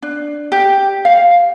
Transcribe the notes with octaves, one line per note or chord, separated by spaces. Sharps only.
D4
G4
F5